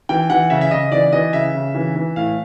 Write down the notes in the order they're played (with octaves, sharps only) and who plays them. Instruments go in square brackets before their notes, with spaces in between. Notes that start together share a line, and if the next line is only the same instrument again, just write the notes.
[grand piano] E3 G5
E3 F#5
C#3 E5
E5
C#3 D#5
E3 D5
E3 D#5
C#3 E5
C#3
E3
E3
A2 F5